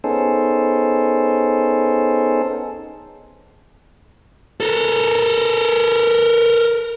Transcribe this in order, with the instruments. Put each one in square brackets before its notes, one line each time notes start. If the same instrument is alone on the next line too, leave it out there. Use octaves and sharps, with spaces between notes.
[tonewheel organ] B3 C#4 D#4 G#4 A4 C5
[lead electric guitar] A4 A#4